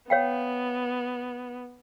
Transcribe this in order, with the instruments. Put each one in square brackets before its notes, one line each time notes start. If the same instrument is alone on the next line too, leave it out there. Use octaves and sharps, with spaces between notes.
[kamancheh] B3 [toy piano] C#5 F5 G5